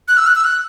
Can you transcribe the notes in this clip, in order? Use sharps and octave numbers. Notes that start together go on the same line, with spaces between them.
F#6
E6
F#6
E6
F#6